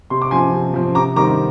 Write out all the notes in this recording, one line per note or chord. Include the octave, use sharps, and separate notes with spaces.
C3 C6
D6
F3 C4 G#5 C6
C3
F3 C4
C3 A#5 D6
D#3 G3 C4 A#5 D6